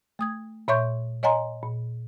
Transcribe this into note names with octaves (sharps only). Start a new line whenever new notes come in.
A3 D#6 G#6
A#2 C#5 E5 C6 C#6 G6
C#5 D#5 F#5 G#5 A#5 C6
A#2